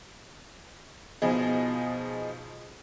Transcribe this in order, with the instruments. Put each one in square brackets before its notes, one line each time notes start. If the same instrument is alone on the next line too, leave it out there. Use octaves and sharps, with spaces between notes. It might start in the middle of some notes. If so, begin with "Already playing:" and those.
[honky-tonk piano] B2 F3 D#4 G#4